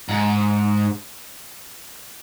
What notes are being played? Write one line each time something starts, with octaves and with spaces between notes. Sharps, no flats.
G#2